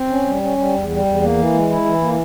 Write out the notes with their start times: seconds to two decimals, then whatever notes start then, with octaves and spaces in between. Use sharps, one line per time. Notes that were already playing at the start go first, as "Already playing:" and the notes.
Already playing: C4
0.10 C#4
0.25 G3
0.42 C#4
0.58 G3
0.74 E2
0.89 G3
1.05 E2
1.21 A#3
1.36 E3
1.54 G#3
1.70 E4
1.85 E3
2.01 A#3